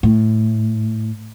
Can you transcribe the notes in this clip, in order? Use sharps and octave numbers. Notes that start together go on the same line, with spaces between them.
A2